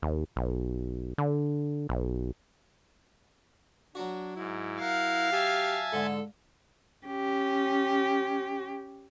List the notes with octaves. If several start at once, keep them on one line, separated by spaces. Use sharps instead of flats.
D#2
B1
D3
B1
F#3 D4 F#4
G#2 E4
A#4 F5 F#5
G4 E5 G#5 A5
G#2 D3 A4
C#4 G4